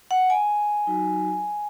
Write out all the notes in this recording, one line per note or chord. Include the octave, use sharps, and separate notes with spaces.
F#5
G#5
F#3 D#4 F#4